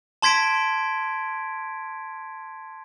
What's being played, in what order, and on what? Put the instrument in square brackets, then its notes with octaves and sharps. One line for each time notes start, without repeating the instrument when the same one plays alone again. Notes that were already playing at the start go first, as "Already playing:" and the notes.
[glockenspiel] A5 C6 G#6 B6 D7